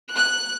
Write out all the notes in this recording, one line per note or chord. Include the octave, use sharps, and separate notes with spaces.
F#6